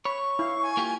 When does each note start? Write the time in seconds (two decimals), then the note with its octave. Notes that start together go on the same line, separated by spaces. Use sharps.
0.05 C#5 B5 C#6
0.39 E4 F5
0.62 G#5
0.77 A#3 F4 G4